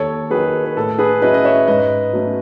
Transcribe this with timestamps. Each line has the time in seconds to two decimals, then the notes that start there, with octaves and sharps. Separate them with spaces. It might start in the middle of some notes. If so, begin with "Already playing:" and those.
Already playing: D#2 A4 C#5
0.31 D#3 F#3 G#4 B4
0.66 B4
0.77 A2 A4
0.99 G#4 B4
1.21 F#3 C#4 E4 B4 D#5
1.34 D#5
1.45 C#5 E5
1.68 G#2 B4 D#5
2.13 F#3 A3 C#4